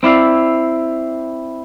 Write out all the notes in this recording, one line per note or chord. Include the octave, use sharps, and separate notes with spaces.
C4 E4 D5 F5